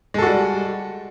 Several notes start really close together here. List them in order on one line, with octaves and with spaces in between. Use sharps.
G#3 A4 F#4 G3